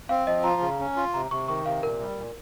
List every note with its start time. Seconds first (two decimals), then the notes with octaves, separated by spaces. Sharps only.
0.09 C4 F5
0.27 F3 D#5
0.44 F4 A#5
0.61 C#3
0.79 C#4
0.96 F4
1.14 C3 A#5
1.31 C3 C#6
1.48 D#3 C#6
1.66 C3 F5
1.83 A#2 A#4
2.01 G3
2.18 A#2